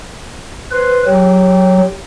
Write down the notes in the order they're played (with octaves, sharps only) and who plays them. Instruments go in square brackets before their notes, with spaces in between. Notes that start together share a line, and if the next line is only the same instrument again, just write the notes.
[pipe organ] B4 [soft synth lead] C5
[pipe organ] F#3 [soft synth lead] G4